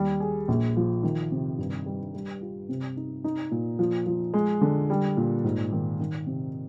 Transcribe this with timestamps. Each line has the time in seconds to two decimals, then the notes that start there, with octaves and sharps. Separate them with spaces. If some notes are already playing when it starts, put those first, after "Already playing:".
Already playing: D#2 G3
0.20 G#4
0.48 A#1
0.77 F3
1.03 D#3
1.32 C3
1.58 G2
1.86 G3
2.14 G3
2.41 F4
2.69 C3
2.97 D#4
3.24 D#4
3.51 A#2
3.79 F3
4.06 F3
4.34 G#3
4.61 D3
4.90 G3
5.17 A#2
5.44 G#2
5.72 D#3
6.00 D#3
6.27 C3